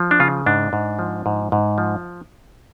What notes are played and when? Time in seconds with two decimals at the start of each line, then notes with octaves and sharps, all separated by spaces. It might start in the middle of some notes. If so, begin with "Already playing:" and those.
Already playing: F3
0.11 D4
0.20 C#3 F4
0.46 G#2 D4
0.73 G#2
0.99 F3
1.26 G#2
1.52 G#2
1.78 F3